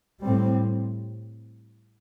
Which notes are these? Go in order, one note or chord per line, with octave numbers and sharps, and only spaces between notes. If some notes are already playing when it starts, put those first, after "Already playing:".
A2 G3 C4